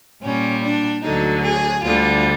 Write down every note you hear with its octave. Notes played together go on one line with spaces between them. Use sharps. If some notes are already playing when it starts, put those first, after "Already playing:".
A#2 G3 C#4
D4
D2 D3 F#3 D#4
G#4
D2 D3 G3 F4